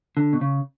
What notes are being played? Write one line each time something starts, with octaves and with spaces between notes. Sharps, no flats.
D3
B2
C#3